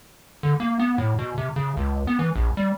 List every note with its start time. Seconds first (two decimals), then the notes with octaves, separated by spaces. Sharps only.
0.43 D3
0.60 A#3
0.80 B3
0.98 A2
1.19 B2
1.38 C3
1.56 C#3
1.77 C#2
2.07 B3
2.19 E3
2.36 A#1
2.57 G3